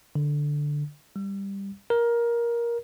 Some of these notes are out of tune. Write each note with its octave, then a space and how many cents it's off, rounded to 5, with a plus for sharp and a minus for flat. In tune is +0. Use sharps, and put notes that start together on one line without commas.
D3 +0
G3 +10
A#4 +15